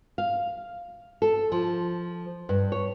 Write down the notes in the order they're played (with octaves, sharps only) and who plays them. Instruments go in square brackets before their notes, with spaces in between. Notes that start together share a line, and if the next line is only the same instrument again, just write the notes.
[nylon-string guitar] F5
A4
F3
G2
C#5